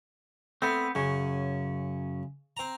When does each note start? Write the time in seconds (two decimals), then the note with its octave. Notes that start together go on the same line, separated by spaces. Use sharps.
0.62 A3 B3 C4
0.95 F#2 C#3 C#4
2.57 C4 A#5